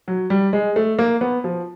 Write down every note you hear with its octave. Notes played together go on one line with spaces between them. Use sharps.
F#3
G3
G#3
A3
A#3
B3
F3